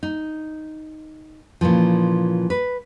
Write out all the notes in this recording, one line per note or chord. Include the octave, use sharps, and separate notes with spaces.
D#4
A#2 C#3 E3 F3
B4